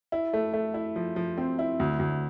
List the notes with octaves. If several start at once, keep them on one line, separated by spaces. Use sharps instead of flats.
E4
A3
A3
E4
F3
F3
C4
E4
D2
D2